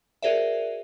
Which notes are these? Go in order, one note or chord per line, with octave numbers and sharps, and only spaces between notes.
F#4 G#4 A#4 C5 D5 E5